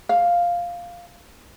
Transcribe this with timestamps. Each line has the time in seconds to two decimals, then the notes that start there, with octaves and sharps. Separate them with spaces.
0.09 F5